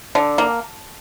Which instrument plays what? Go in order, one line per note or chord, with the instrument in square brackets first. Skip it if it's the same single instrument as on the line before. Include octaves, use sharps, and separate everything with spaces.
[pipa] D3
A#3